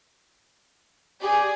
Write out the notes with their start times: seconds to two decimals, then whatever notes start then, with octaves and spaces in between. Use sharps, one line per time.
1.22 G4 G#4 D5